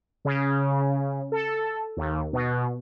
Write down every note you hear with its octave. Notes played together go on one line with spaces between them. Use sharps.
C#3
A4
D#2
B2